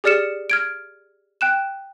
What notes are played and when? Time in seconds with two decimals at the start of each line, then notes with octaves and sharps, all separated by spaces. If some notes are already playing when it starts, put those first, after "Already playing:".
0.04 G4 G#4 D5 F6 C#7 E7
0.50 F6 G#6 D7
1.41 G5 F#6 E7